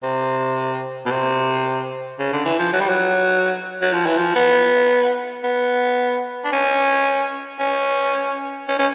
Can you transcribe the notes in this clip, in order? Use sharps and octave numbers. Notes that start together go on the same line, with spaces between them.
C3
B2
C3
C#3
D3
E3
F3
F#3
G3
F#3
F#3
F3
E3
F3
B3
B3
D4
C#4
C#4
C#4
C#4